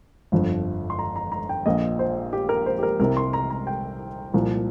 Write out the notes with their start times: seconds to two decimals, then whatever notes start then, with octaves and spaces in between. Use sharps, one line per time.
0.32 G1 F2 F3
0.90 C6
0.99 A#5
1.16 A#5
1.32 A#5
1.49 G5
1.66 A#1 A#2 F3 D#5
1.99 C5
2.33 G4
2.49 A#4
2.66 C5
2.79 G4
2.83 A#4
3.00 C2 C3 G3 A#4
3.17 C6
3.33 A#5
3.50 A#5
3.67 G5
4.34 C2 A#2 F3